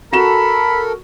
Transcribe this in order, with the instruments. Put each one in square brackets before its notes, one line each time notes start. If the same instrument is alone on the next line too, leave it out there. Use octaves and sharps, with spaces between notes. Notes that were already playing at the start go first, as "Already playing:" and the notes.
[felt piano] F#4 E7 [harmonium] A4 A#4 [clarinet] B5